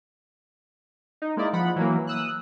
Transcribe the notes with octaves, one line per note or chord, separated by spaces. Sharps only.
D#4
G#3 A#3 E4 D5 D#5
F3 F#5 B5
E3 F#3 A#3
D#6 E6 F#6